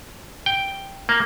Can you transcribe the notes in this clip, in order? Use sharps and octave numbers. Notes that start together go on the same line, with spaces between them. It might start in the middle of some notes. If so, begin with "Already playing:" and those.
G5
A#3